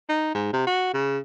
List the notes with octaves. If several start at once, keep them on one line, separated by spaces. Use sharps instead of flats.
D#4
G#2
C3
F#4
C#3